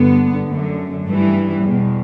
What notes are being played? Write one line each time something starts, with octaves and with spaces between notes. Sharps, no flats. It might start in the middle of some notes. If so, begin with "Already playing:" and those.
Already playing: G2 D3 B3
F#2 D3 A3
G2 E3 A3
G3
E2 B2